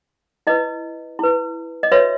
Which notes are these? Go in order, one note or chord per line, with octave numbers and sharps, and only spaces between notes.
E4 B4 D#5
E4 B4
D#5
F#4 B4 C#5 E5